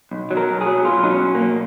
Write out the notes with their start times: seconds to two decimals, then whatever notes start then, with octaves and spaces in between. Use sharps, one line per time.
0.11 B1
0.31 F#3
0.37 A#4
0.49 B1
0.61 G#4
0.66 F#3
0.85 B2 F4
1.04 F#3 D#4
1.09 C#4
1.22 B1
1.35 A#3
1.41 B1